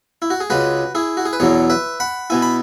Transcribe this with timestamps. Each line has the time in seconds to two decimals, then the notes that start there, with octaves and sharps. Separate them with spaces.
0.22 E4
0.30 F#4
0.40 G#4
0.50 C#2 C#3 G#3 F#4 B4
0.95 E4 G#4
1.17 F#4
1.26 G#4
1.33 B4
1.40 E2 B2 F#3 E4 G#4 C#5
1.70 B4 E5
2.00 F#5 B5
2.30 B2 B3 E4 G#5
2.42 B5